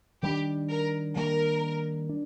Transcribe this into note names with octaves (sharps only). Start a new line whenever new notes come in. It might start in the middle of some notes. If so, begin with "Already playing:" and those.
D#3 G3 A#3 D4 G4
A#4
D#3 G3 A#3 D4 A#4
D4